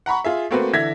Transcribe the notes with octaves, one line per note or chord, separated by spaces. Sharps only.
F#5 A#5 B5 C#6
F4 G#4 E5
A3 A#3 C4 F#4 B4
D3 E3 E5 G#6 A#6 B6